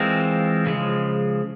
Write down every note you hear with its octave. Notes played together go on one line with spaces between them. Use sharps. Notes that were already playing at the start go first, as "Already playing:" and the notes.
Already playing: E3 G#3 C4 F4 A#4
C#3 F3 G#3